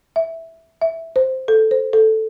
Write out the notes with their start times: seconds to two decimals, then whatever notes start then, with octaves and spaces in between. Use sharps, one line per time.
0.16 E5
0.82 E5
1.16 C5
1.48 A4
1.71 C5
1.93 A4